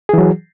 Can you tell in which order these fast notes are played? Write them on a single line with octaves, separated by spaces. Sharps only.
G#4 E3 F#3